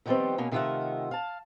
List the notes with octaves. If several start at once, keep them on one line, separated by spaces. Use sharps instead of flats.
D3 D#3 F3 G3 B3 C4
B2 A#3 C#4
C3 D#3 A3 F4 E5 F#5
F5 A5